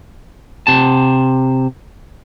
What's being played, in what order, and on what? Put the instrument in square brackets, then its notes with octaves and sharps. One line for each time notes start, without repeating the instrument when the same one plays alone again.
[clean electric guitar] C3 A5